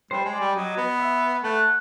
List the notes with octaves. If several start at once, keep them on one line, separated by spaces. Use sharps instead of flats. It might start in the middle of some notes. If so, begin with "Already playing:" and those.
G3 C5
G#3
D5
G3
F#3 D#5
B3
E5
A3 F#5